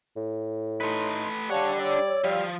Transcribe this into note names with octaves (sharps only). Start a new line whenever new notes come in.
A2
A3 D#4 B4 C6
G3 D4 C#5 F5 F#5 A5 D6
C#5 D5 E6
F3 G3 F5